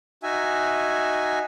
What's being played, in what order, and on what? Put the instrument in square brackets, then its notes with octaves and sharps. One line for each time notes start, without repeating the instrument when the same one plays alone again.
[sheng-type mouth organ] D#4 F#4 E5 G#5